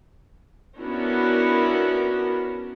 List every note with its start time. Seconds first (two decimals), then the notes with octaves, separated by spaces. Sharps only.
0.78 B3 C#4 D4 E4 F#4 A#4